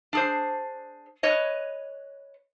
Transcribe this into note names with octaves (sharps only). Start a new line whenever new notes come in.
D4 G#4 C5
B4 C#5 D#5